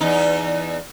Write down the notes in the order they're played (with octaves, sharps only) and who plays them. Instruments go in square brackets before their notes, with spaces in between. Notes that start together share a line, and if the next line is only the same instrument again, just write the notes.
[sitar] E2 D#4